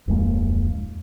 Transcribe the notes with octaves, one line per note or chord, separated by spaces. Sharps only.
D1 F2 G#3 A#3